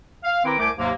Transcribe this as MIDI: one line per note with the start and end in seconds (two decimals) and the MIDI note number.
0.24 0.44 77
0.45 0.57 51
0.45 0.57 60
0.45 0.57 64
0.45 0.57 71
0.45 0.57 82
0.45 0.57 86
0.59 0.70 36
0.59 0.70 57
0.59 0.70 70
0.59 0.70 72
0.59 0.70 80
0.59 0.70 86
0.78 0.91 39
0.78 0.91 44
0.78 0.91 48
0.78 0.91 54
0.78 0.91 58